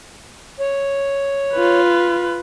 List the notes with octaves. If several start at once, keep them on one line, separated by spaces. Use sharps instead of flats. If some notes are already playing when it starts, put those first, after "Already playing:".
C#5
F4 B4